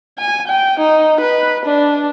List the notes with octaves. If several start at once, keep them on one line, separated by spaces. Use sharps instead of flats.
G#5
G5
D#4
B4
D4